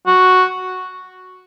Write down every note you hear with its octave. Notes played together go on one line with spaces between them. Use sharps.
F#4